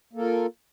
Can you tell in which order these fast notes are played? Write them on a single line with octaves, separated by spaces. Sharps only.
A#3 A4 A#4 F4